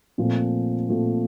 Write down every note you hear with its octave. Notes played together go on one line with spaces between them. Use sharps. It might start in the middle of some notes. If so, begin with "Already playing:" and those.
A#2 F3 A3 C4
A#2 F3 A3 C4